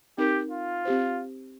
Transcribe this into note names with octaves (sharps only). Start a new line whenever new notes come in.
C4 D#4 G4 A#4
F4
C4 G4 C5